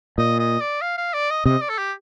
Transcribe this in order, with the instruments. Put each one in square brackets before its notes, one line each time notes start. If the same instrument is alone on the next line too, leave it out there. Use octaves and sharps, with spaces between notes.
[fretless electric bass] A#2 [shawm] D#5
[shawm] D#5
D5
F5
F5
D5
D#5
[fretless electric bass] C3 [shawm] D#5
[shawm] D5
A4
G4